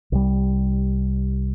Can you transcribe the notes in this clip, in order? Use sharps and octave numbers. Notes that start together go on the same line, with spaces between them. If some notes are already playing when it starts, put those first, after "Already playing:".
C2 G3